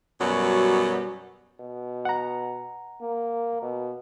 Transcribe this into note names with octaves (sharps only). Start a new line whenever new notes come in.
F#2 B2 F#3 G3
B2
F#5 A#5
A#3
B2